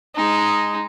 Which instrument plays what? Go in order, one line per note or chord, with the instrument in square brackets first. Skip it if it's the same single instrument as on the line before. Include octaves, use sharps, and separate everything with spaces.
[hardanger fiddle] G#3 D#4